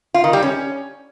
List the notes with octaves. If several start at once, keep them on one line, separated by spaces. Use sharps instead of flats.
F4
D#3
G3
C#4